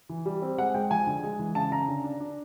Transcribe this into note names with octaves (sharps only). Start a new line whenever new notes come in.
E3
G3
C4
G#3 F#5
G#3 G5
F3 G#5
D3
G#3
E3
C#3 A5
C#3 A#5
D3
D4
D4